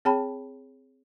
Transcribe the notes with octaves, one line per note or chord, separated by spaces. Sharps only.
C4 G#4 C#5 G5 A5 B5